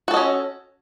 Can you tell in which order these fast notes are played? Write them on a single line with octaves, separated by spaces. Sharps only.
F#4 A4 D#5 C#4